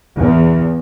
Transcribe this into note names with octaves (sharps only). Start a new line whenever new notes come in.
E2